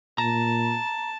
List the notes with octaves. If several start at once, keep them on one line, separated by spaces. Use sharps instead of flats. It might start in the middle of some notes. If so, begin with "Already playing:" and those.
A#2 A5 A#5